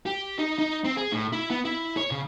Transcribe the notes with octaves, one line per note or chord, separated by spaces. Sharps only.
G4
D#4
D#4
C4
G#4
A2
E4
B3
E4
C#5
C#3